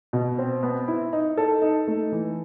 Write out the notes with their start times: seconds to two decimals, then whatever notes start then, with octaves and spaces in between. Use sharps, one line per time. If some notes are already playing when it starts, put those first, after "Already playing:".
0.13 B2
0.38 C4
0.63 B3
0.88 E4
1.13 D#4
1.37 A4
1.62 D#4
1.88 A3
2.12 E3